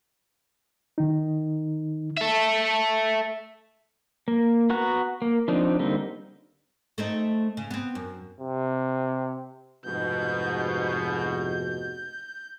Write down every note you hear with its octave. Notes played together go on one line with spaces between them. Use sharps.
D#3 D#4
A4 E5
A#3
B3 F#4 F#5 A#5 F#6
A#3
F3 C4 D4 D#4
D3 G3 A#3 C4 D#4
A3 C4 D#4
C#3
B3 C4
F#2
C3
F1 G#2 B2 G6